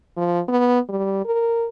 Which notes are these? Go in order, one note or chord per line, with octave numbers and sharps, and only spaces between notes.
F3
B3
G3
A#4